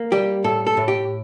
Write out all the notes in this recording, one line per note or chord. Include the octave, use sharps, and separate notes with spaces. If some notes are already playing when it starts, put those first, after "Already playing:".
Already playing: A#3
G3 G4
A2 A4
A4
A2
G4